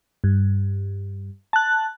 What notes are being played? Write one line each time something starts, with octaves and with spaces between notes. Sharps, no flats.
G2
A5 F#6